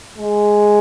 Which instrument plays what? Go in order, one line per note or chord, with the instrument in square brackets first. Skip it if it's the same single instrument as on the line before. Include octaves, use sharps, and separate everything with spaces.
[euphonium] G#3